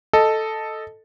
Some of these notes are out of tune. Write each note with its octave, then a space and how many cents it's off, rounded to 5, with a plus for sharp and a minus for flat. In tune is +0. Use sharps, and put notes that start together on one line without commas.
A4 +0 D#5 +0